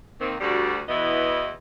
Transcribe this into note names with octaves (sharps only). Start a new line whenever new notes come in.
D#3 A#3 C4
D2 G3 F#4
E2 B2 E3 B3 E4 D#5